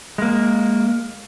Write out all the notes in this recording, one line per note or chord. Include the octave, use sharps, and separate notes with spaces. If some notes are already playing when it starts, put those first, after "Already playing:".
G#3 A#3